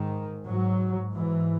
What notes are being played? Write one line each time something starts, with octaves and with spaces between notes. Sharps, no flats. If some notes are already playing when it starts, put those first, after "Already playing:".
Already playing: G#2 D#3
G#2 F#3
G#2 E3